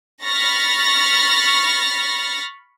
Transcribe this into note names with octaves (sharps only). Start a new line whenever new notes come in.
B5 C#6 F6 A6 A#6